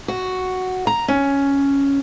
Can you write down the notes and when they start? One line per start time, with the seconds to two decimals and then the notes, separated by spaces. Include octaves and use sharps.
0.08 F#4
0.87 A#5
1.08 C#4